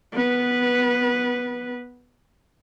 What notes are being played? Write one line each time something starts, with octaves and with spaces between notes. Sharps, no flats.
B3 B4